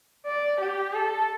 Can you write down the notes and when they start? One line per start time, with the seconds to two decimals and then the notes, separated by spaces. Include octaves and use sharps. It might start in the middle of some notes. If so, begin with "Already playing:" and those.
0.26 D5
0.60 G4
0.93 A4